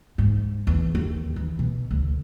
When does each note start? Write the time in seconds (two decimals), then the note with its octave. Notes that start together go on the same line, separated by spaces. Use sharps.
0.18 G#2
0.67 E2
0.95 D#2
1.36 E3
1.59 B2
1.91 D2